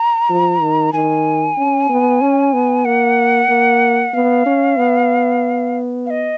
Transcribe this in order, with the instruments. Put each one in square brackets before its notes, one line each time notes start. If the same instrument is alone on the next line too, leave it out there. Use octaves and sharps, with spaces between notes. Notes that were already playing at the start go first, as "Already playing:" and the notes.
Already playing: [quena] A#5
[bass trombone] F3
D#3
[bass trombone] D#3 [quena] G#5
[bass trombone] C#4
B3
C#4
B3
[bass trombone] A#3 [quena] F#5
[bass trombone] A#3
[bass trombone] B3 [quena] F5
[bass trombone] C#4
B3
[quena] F5
D#5